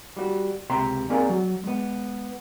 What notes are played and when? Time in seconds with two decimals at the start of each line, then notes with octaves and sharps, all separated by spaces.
0.17 G3 F#4
0.70 C#2 C3 E5 G5 A#5 C6
1.10 A#3 C4 G#4 A#4 D5 F5
1.29 F#3
1.64 G#3 B3